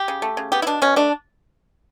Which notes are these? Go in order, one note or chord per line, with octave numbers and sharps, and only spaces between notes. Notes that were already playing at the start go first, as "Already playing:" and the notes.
Already playing: G4
C#3
A3
C#3
B3 G4
E4
B2 D4
B2 C#4
A3 D4